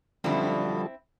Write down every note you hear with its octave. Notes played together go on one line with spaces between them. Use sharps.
F#2 B2 D3 F3 G3 C4 E4 A4